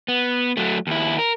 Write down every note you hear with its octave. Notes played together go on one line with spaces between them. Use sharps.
B3
F#3 A3
D#2 E4
A#4